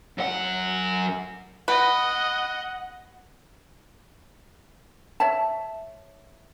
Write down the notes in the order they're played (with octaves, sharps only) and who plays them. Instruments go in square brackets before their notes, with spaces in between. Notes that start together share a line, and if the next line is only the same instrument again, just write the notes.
[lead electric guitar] F#2 F#5
[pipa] B4 [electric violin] D#5 [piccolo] F#5
[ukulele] C#5 E5 A5